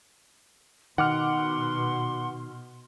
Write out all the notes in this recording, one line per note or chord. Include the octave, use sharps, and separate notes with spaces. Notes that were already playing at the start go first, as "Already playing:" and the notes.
B2 D#3 F#5 C6 D6 F6